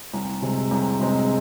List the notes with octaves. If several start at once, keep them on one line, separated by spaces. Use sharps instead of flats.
C2
C3 G#3 C4 G#4
C2
C3 G#3 C4 G#4